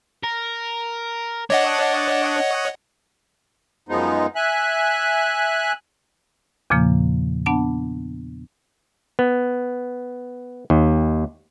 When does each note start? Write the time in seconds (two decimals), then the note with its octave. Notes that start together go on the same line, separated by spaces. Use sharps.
0.24 A#4
1.50 D4 C#5 D#5 F#5
3.89 F#2 F3 G#3 B3 D#4
4.36 E5 G#5 F#6
6.70 E2 A#2 C#3 F3 A#3
7.46 B3 D4 F#5 A5
9.19 B3
10.70 D#2